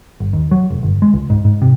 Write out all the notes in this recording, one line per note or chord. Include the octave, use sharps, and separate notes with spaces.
G1
D#2
F#3
F1
G1
G#3
C#2
G#2
G#2
C3